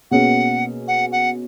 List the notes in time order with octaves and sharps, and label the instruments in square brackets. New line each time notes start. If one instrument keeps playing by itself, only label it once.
[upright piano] B2 A#3 C#4 G#4 [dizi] F#5
[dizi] F#5
F#5